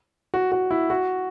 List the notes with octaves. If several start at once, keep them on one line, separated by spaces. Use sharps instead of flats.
F#4
F#4
E4
F#4